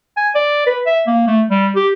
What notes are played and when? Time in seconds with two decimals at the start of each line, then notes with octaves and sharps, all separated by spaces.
0.17 G#5
0.35 D5
0.67 B4
0.87 E5
1.07 A#3
1.27 A3
1.50 G3
1.76 G4